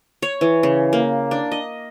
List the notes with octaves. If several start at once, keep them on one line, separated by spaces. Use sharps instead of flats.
C#5
E3
C#3
A#3
D4
D#5